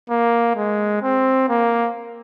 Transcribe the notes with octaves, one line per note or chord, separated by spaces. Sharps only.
A#3
G#3
C4
A#3